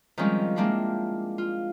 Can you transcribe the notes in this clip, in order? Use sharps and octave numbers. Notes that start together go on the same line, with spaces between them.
D#3 F3 G3 G#3 C4 C#4
G#3 A#3 C4 D4 E4 F4
F4